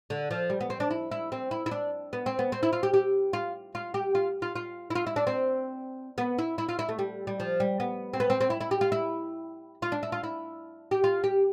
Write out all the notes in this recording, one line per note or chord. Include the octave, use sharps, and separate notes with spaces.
D3
F3
G3
B3
C4
D4
E4
E4
C4
E4
E4
D4
B3
C4
B3
C4
E4
F4
G4
G4
F4
F4
G4
F4
F4
F4
E4
F4
E4
D4
C4
B3
E4
E4
F4
E4
A3
G3
G3
F3
G3
B3
C4
B3
C4
C4
E4
E4
G4
F4
E4
F4
D4
E4
F4
E4
G4
F4
G4